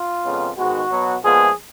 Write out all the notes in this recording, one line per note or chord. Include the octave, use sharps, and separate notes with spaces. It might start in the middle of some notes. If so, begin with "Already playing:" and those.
Already playing: F4
F2 C#3 G#3 B3
G#2 D#3 G#3 B3 F#4
B2 F#3 B3
A#2 F3 G#3 B3 G#4